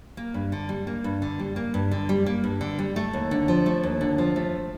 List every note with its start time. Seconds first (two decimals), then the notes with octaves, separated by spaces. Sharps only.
0.17 A#3
0.34 G2
0.52 D3
0.69 G3
0.87 A#3
1.04 G2
1.22 D3
1.39 G3
1.56 A#3
1.74 G2
1.91 D3
2.09 G3
2.26 A#3
2.44 G2
2.61 D3
2.79 G3
2.96 A3
3.13 D#2
3.31 D3
3.48 F3
3.66 A3
3.83 D#2
4.01 D3
4.18 F3
4.36 A3